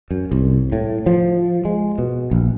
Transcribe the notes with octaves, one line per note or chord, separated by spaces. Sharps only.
F#2
C2
A2
F3
G#3
B2
A#1